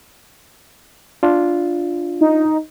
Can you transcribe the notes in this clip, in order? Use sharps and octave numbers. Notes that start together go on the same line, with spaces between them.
D4 F4
D#4